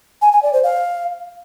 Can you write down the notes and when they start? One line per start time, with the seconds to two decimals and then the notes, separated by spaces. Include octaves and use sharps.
0.22 G#5
0.32 G#5
0.43 D5
0.53 C5
0.64 F5